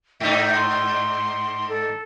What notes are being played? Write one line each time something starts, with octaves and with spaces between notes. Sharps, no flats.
G#2 D#4 E5
C6
A4